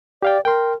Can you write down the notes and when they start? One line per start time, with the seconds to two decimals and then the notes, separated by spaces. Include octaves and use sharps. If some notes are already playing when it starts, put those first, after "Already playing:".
0.22 G4 D5 F5 G5
0.45 A#4 G5 C6